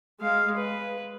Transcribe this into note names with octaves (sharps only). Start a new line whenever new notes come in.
G#3 F5
B4